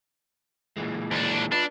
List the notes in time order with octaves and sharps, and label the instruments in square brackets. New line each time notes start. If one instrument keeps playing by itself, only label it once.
[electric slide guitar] A#2 E3 G#3
[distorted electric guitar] D#2 D4
[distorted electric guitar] D4 [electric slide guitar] F4 B4